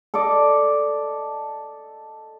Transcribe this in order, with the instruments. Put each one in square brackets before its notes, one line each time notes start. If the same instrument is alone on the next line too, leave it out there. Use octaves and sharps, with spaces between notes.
[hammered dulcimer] A4 D5 D#5 D6